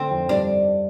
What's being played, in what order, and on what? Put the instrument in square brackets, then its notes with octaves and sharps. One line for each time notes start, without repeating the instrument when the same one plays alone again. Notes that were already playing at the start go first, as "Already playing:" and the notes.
Already playing: [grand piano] D3 [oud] C4
[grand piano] F2 F3
[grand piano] G2 G3 [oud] D4